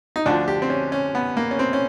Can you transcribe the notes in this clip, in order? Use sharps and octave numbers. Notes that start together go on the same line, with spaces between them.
D#4
D2 D3 F3 D4
G4
C4
C#4
C#4
B3
A#3
C#4
C4
C#4